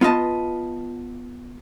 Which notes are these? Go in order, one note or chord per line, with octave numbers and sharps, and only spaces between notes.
B3 F4 B4 D#5 A5